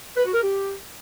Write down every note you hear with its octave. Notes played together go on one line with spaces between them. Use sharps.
B4
F#4
A#4
G4